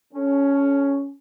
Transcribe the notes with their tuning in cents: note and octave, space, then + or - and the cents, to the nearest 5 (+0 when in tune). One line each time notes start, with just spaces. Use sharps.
C#4 +5 A4 -30